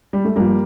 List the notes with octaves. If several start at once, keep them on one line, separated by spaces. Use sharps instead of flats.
G3
A3
G2 F3 G3 A#3